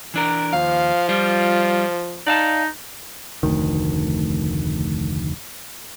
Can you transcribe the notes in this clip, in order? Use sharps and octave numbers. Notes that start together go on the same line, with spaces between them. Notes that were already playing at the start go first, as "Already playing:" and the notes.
E3 D4 A#4
D#2 F3 F5
G3 F4
D#4 D5 F5 A5
F1 D2 D#3